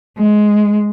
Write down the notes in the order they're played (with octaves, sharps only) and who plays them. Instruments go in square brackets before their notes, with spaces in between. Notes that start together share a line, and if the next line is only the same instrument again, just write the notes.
[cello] G#3